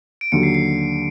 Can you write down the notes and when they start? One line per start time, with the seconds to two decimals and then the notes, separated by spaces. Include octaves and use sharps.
0.21 D7
0.32 D#2 D3 F#3 C#7
0.43 C7
0.54 C7